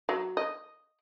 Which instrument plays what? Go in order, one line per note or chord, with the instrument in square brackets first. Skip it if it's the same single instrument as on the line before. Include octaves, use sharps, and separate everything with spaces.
[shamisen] F#3
D#5